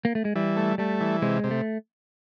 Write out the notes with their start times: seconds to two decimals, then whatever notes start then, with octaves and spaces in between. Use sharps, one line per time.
0.05 A#3
0.15 A3
0.25 G#3
0.36 E3 G3
0.57 A3
0.78 G3 A3
1.01 E3
1.22 C3 G#3
1.44 C3
1.51 A3